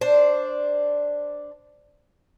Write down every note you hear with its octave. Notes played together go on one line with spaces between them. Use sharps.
D4 C5